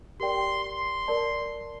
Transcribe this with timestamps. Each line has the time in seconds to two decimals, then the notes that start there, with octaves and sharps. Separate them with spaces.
0.20 G4 A#4 D5 G5 C6
0.64 C6
1.08 A#4 D5 A5